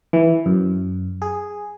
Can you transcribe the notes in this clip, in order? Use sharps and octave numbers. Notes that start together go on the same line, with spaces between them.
E3
F#2
G#4